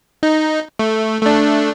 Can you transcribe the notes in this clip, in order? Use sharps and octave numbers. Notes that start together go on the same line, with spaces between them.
D#4
A3
A3 D4